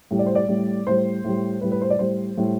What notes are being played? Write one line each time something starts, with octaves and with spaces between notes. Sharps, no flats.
A2 G3
D5
C5
D5
A2 G3
A2 G3 C5
A2 G3
A2 G3 B4
B4
C5
D5
A2 G3 C5
A2 G3